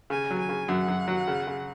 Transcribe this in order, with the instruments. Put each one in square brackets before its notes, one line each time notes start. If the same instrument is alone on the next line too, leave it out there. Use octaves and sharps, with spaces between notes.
[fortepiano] C#3 [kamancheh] G#5
[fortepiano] F#3
[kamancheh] G#5
[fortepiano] C#3
[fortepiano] F#2 [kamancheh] F#5
[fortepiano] F#2
F#3
C#3
C#3